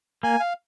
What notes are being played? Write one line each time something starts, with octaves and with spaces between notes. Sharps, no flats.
A#3 G#5
F5